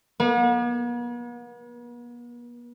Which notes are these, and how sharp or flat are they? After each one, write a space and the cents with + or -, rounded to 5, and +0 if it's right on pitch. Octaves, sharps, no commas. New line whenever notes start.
B3 -45